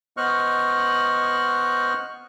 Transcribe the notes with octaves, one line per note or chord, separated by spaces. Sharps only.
B3 C5 D#5 C#6 F6 F#6